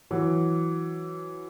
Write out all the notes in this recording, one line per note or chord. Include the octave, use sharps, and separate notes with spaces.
E3 F#3